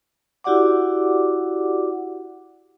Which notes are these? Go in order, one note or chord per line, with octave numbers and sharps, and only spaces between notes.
E4 F#4 G4 D5 F#5 D6